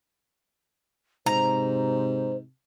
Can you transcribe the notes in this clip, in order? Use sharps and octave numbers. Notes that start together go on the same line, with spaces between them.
G#2 C3 C5 A#5